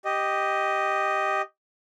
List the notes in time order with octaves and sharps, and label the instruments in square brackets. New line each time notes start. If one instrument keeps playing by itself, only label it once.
[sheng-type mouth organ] G4 D#5